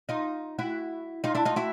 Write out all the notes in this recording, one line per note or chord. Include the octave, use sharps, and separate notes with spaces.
D#4 F4
E4 F#4
D#4 F4
D4 E4
D#4 F4
E4 F#4